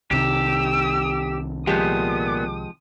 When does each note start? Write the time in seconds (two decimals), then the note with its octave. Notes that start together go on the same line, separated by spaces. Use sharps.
0.11 C2 C3 D#3 G4 E6
1.67 A#2 F3 G#3 B3 G4 D#6